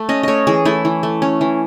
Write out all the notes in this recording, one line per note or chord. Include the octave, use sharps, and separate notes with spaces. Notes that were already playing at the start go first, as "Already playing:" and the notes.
Already playing: A3
C#4 D#5
A3 C#5 D#5
E3 G#4
A3 E4
E3
A3
C#4
E3